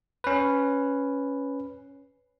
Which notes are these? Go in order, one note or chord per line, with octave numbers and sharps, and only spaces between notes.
C#4 B4